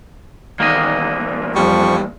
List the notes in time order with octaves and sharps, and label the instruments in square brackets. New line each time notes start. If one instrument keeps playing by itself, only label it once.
[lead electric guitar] E2 A#2 [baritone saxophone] D#3 [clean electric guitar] A#3 D#5
[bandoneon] F2 F3 C#6 [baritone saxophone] G3